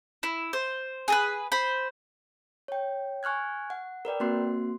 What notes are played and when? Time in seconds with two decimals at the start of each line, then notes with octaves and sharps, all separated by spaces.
0.23 E4
0.53 C5
1.08 G#4 A4 B4
1.52 C5 B5
2.68 C#5 G5
3.23 G#5 C#6 F6 F#6 G#6
3.70 F#5
4.05 A#4 B4 D5 G5
4.20 A#3 C4 F#4 C6 C7